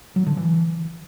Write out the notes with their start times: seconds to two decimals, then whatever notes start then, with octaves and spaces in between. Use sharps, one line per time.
0.16 F#3
0.26 D3
0.37 E3